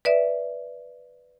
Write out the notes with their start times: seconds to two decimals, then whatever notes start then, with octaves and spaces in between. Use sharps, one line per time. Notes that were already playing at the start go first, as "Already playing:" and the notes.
0.05 B4 D5 E5